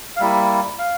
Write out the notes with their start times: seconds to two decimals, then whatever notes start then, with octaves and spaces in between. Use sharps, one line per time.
0.16 F5
0.20 G3 A#3 E4 E5
0.79 F5